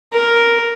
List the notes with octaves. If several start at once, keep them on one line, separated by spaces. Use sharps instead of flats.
A#4